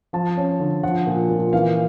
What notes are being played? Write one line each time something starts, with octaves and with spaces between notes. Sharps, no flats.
F3 A5
C#4
D3
F3 F#5
A#2
A#2
E3 F5